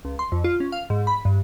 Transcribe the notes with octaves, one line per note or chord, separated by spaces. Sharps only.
C#2
C6
F2
F4
C#4
F5
G#2
B5
G2